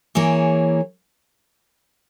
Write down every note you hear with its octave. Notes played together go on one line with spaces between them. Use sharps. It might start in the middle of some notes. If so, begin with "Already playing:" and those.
E3 A#3 E4 G#4 C#5